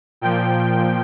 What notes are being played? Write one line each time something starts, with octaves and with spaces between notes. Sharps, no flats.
A#2 F3 G5